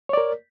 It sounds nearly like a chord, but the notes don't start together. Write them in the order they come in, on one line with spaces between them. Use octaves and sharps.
C#5 D5 A#4